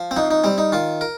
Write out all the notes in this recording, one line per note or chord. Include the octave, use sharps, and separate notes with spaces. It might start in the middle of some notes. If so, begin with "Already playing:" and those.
Already playing: F3
C4
F2 D#4
D#4
G3 C4
D#4
D#3 F4
A#4